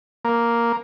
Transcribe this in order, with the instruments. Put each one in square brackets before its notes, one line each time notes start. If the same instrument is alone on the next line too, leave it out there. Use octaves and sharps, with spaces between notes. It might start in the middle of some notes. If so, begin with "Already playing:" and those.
[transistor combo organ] A#3